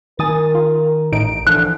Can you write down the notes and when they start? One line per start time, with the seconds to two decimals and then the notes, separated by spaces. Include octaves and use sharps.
0.19 D#3 A#4 G#5 D#6 A6
0.55 F4
1.12 A1 A2 D#4 D7
1.47 D3 E3 F3 F#6